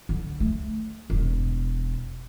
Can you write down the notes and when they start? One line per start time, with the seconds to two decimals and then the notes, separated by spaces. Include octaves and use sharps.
0.09 D3
0.40 A3
1.10 E1